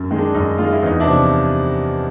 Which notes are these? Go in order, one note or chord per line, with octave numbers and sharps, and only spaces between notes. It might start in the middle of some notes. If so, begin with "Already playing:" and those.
Already playing: F#2
D#3 G#3
D4
F#2 D#4
D#3 G#3 F4
E4
E2 D#4
D4 E4
C3 F3